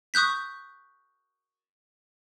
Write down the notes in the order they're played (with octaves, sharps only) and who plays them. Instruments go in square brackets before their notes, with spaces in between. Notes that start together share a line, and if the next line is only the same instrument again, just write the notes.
[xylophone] C#6 D#6 F#6 G6 B6